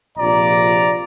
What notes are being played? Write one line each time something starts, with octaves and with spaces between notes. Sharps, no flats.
A#1 C3 F4 D5 A#5